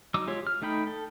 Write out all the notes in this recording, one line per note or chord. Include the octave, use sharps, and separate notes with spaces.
F#3 D#4 D6 E6
G#3 F4 G4 C#5
F6
A3 D#4 G5 B5
A4